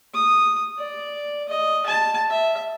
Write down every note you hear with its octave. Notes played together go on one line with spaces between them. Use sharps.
D#6
D5
D#5
A5
E5